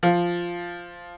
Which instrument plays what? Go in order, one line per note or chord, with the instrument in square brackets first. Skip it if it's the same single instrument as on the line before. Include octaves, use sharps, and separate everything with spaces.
[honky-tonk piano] F3